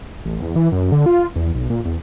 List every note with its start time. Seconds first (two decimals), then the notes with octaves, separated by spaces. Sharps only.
0.25 A1
0.42 E2
0.56 E3
0.72 F#2
0.92 D3
1.06 F4
1.36 E2
1.55 B1
1.70 A#2
1.85 E2